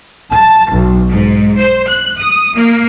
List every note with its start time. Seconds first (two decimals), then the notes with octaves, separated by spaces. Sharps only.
0.32 A5
0.70 B1
1.09 G#2
1.58 C5
1.88 F#6
2.20 D#6
2.55 A#3